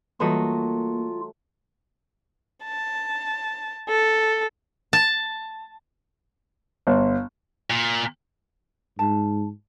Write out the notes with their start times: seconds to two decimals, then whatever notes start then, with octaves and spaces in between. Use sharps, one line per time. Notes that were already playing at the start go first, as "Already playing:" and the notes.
0.20 E3 F#3 G3 A3 A#3 F4 D#5
2.64 A5
3.89 A4
4.93 A5
6.87 G1
7.70 A#2
8.99 G#2 A5